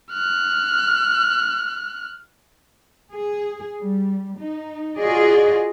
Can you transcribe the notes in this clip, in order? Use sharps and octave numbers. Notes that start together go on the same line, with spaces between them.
F6 F#6
G#4
G3
D#4
F4 F#4 G#4 D5 D#5